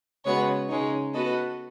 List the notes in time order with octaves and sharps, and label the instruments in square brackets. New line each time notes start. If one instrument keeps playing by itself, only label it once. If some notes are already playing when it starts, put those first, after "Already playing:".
[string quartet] C#3 G#3 B3 F#4 [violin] C#5
[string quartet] C#3 G#3 D#4 [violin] C#5
[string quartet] B3 F#4 B4 D#5 [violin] A4